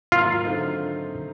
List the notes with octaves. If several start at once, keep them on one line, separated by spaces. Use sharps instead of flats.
G#2 D#3 F#3 A#3 F4
D3 F#3 A3 C4 D#4